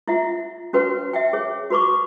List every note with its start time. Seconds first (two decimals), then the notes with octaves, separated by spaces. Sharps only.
0.08 E4 F4 E5 F#5
0.73 C#4 F#4 B4 C#5 F#5
1.13 E5 F#5 G5
1.33 G#4 C#5
1.70 F#4 B4 B5 C#6 D6